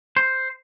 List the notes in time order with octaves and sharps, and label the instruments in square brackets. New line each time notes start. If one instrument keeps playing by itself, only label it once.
[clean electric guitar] C5